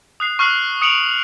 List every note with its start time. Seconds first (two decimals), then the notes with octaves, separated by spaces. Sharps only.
0.20 D#6 F#6 C7
0.39 C#6 F6 F#6 C7 F#7
0.82 D#6 C#7 D7 F7 F#7